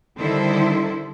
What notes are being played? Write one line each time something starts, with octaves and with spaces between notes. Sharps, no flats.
D3 D#3 G3 E4 A4 C5